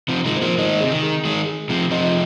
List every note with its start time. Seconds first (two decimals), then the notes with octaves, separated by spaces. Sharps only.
0.08 C3 F3
0.14 F4
0.25 D#3 G#3
0.36 C5
0.42 F3 A#3
0.58 D#3 G#3 D#5
0.81 C3 G#4
0.91 D#3
1.03 G#4
1.25 D#3 G#3 G#4
1.47 G#4
1.69 C3 F3 G#4
1.91 C3 F3 D#5